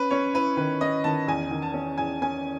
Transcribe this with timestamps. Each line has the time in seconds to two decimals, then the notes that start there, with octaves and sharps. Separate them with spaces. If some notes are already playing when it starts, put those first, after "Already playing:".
Already playing: C#4 B4
0.11 C#4 C#5
0.34 E4 B4
0.57 D#3 B4
0.81 C#4 D#5
1.04 D#3 A5
1.28 E2 G#5
1.51 D#3
1.62 A5
1.74 C#4
1.98 E2 G#5
2.22 C#4 G#5